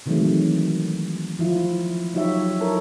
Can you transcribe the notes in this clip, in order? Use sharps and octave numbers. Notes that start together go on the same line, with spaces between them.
C3 D#3 E3 F#3 G#3 A3
F3 E4 F4
F#3 D#4 F4 G4 C#5 E5
E4 A4 A#4 C#5